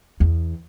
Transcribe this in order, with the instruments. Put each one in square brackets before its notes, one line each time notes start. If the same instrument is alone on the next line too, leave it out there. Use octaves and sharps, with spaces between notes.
[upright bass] E2